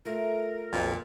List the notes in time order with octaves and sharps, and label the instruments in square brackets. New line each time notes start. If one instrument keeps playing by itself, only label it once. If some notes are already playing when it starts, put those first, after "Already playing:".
[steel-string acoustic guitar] A3 F4 [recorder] A#4
[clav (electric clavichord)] B1 F2 [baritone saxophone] A#2